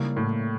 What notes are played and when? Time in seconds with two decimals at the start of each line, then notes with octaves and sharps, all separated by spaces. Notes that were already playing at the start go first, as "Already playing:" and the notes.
Already playing: C#3 G3 A#3 E4
0.17 A2